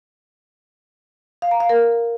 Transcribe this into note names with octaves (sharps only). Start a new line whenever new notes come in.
F5
A#5
F5
A#4